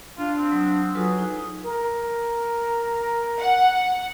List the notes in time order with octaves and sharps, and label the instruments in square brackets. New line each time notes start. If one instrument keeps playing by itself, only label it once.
[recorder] D4 [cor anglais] F4
[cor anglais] C4
[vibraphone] F#3 D#6
[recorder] F#3 [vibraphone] F4 A4 B4 [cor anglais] G#4
[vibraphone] D#4
[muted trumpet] A#4
[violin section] F#5